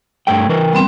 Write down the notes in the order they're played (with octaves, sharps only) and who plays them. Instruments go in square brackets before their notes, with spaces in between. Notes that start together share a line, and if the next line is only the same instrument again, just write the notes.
[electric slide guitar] G2 A3 G5
E3 A#4 B4
[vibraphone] G3 B3 C4